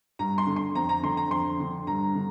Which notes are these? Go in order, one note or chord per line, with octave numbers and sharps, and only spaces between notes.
G2 A#5
C6
D3
C6
F2 A#5
A#5
D3 C6
A#5
F2 C6
D3
G2 A#5
D3